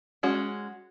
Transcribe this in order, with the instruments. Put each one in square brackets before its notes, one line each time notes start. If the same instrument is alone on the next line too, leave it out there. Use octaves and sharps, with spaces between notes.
[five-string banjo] G#3 C#4 F#4